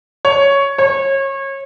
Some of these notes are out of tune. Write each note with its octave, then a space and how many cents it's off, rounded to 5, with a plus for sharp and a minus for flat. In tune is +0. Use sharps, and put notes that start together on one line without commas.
C#5 +5
C#5 -30